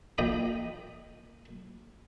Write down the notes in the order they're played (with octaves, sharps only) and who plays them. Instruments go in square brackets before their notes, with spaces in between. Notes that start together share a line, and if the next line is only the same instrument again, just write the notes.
[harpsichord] A#1 D#5 G5 B5 D#6